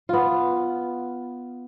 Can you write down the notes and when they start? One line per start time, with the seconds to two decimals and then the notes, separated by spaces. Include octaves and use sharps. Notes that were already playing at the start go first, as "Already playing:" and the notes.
0.09 B3 F4